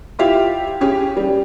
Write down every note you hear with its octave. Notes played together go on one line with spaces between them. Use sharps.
E4 F4 G4 E5 F5
C#4 G4 G#4
G3